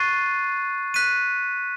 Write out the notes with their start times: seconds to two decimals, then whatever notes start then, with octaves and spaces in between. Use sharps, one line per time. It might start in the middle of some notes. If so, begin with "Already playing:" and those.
Already playing: C#6 F#6 A6 C7 D#7
0.94 F#6 B6 D#7